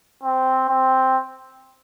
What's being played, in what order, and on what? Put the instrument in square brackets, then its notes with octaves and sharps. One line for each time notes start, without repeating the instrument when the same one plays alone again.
[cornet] C4
C4